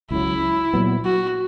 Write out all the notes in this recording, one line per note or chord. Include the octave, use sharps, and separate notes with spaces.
C#2 C#3 F#3 E4
A#2 F#3 B3
F#4